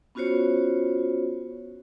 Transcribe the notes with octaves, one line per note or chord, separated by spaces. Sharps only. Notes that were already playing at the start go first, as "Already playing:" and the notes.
B3 C#4 F4 F#4 C5 C#5